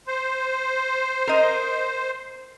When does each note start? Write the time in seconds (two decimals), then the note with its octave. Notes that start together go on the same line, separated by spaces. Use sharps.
0.07 C5
1.27 A#4 D#5